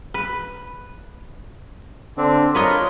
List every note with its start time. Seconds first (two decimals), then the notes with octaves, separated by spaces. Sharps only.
0.14 B4
2.17 D3 C4 D4
2.55 F4 A#4 B4 C#5 D#5